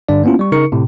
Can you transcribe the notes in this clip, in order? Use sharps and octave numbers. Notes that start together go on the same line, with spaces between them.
G2 D3 D4 D5
A#3 B3 C#4 E4 F4
G3 C#6
C#3 D#4 A#4 C#6 C#7
A2 C3